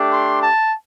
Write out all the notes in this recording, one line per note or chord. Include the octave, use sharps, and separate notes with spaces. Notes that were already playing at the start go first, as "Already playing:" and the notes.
Already playing: A3 D4 G4
C6
A5